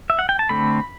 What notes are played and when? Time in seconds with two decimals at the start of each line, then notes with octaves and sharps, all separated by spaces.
0.10 E5
0.19 F#5
0.29 G5
0.39 A5
0.49 D3 A3 C4 B5